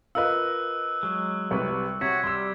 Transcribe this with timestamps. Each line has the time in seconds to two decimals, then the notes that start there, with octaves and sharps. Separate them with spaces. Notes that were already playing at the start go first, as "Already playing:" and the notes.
0.15 F4 A#4 B4 D#5 F5 E6 F#6
1.03 F#3 G#3
1.51 C2 G3 B4
2.01 C3 F#4 C#5 G#6 B6
2.24 G3 C6 E6